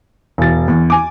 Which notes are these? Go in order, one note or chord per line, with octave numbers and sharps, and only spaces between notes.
E1 A6
E2
G#5 D6